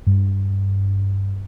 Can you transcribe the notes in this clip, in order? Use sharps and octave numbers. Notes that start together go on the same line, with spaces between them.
G2